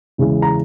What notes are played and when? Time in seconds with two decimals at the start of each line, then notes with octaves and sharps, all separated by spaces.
0.18 E2 C#3 E3 G#3
0.42 A#5